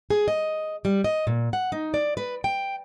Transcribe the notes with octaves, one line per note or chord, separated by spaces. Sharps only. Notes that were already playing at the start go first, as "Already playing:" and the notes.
G#4
D#5
G3
D#5
A#2
F#5
D#4
D5
B4
G5